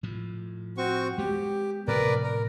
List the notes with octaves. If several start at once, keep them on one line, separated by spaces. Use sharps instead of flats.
A2 F3
C4 F#4 C#6
G#3 B3 G4
A2 C3 F3 A#4 B4 D5
A#4